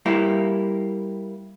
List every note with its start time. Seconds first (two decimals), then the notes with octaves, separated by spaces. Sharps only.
0.06 G3 A#3 E4